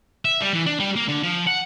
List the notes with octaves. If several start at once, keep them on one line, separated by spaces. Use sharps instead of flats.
E5
G3
E3
D4
G3
A#3
D3
F3
F#5